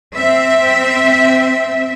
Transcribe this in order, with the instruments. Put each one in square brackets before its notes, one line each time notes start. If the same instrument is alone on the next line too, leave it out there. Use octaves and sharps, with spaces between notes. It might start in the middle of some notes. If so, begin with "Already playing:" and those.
[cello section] C4 E5